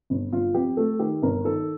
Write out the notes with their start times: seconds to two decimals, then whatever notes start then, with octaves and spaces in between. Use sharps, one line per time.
0.10 G1
0.32 G1 F4
0.54 F2 G4
0.77 A3 A4
0.99 D#3 G4
1.22 G1 A#4
1.44 D#3 A4